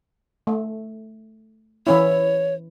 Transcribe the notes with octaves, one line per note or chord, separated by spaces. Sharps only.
A3
E3 C#4 E4 C#5